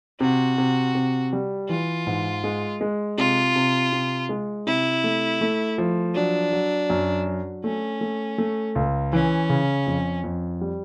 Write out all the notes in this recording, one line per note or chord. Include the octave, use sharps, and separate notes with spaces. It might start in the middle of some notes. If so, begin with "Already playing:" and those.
C3 F#4
C3
C3
G3
E3 F4
G#2
G#3
G#3
C3 F4
C3
C3
G#3
C3 E4
A3
A3
F3
F#3 D4
F#3
F#2
F#3
A3 C#4
A3
A3
C#2
E3 C#4
C#3
F2
F2
G3